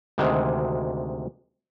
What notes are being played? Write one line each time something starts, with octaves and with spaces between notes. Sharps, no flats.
D2 C3 D#3 G#3